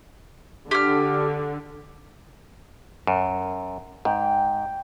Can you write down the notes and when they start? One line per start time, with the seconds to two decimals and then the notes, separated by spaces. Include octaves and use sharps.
0.71 D3 G4 F6
3.07 F#2
4.05 G#2 G5